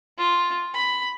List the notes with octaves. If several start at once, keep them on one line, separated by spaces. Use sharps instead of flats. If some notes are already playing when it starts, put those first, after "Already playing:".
F4
B5